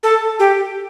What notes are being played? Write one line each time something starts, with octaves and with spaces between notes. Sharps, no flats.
A4
G4